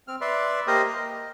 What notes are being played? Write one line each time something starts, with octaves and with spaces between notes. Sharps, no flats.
C4 F6
B4 D5 E5 C6
A#3 G4 A#4 C5 D#5 D#6
D#5